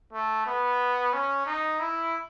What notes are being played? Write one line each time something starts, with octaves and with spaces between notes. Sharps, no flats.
A3
B3
C#4
D#4
E4